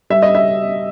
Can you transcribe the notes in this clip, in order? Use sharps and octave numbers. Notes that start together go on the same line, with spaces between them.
G3 E5
D#5
E5